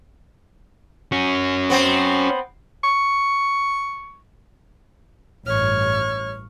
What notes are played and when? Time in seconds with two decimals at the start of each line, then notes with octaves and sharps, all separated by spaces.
1.12 C#4 F#4
1.70 B3 C4
2.84 C#6
5.47 A1 G2 C#5 C#6 F6